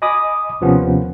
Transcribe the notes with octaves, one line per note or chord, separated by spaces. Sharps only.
D#5 G#5 B5 D6 D#6
D#2 C3 F3 A#3 B3 C#4